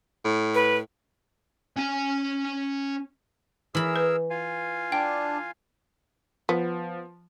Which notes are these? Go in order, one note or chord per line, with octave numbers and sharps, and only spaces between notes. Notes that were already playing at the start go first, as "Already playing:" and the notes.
A2
B4
C#4 G#5
E3 G#4 A#4 B5 E6
B4
F4 F5 G#5
D4 G5
F3 B3